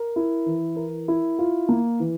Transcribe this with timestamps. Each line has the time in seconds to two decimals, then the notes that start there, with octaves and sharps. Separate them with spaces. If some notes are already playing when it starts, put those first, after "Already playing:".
Already playing: A#4
0.16 E4
0.46 E3
0.76 A#4
1.08 E4
1.39 F4
1.69 A#3
2.00 E3